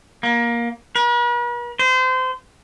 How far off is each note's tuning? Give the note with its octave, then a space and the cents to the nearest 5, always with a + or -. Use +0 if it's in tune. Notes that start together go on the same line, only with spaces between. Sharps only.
A#3 +15
B4 -45
C5 -30